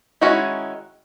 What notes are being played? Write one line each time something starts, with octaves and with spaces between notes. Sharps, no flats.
D#3 G#3 C#4 E4 F#4